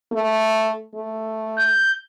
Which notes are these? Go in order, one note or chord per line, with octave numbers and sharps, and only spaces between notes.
A3
A3
G6